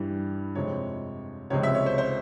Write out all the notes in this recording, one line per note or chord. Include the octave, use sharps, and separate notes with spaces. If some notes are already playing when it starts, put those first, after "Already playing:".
Already playing: G2 E3 G3
F2 C3 F3 G#3 C#5
C#2 C3 F3 G#3 C#5
E5
C#5
C5
C5